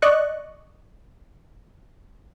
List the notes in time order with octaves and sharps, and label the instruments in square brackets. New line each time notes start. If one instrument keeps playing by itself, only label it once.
[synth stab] D5 D#5 C#6 F#6